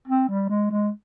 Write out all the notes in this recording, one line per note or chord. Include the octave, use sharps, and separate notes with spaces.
C4
G3
G#3
G#3